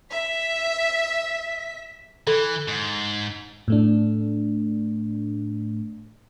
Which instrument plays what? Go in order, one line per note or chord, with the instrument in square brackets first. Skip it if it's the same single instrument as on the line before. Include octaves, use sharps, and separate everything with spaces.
[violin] E5 B6
[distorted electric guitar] E3 [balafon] A4
[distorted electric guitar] G#2
[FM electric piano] A2 A3 D4